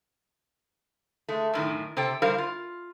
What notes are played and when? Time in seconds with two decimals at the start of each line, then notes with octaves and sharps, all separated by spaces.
1.28 G#3 A3
1.53 F#2 A2 D#3
1.97 C3 A4 C5 G5
2.22 G3 A#4 C5 F5
2.38 F4